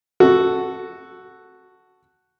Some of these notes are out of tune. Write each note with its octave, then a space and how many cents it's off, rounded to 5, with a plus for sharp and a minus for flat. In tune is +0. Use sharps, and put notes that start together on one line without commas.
F#4 +0 A4 +0